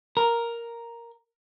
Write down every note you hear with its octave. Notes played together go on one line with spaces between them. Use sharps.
A#4